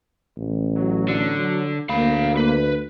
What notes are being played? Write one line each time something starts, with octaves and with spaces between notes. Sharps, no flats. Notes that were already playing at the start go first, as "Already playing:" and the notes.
A1
F#3
D3
D2 A#3 F5 B5
B4